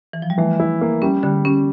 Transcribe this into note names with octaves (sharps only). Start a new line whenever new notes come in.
E3
F3
G3
E3 A3
E4
A#3
G3 C#4
D3 G3
G3 C#4